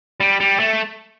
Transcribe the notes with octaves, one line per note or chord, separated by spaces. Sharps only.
G3
G3
A3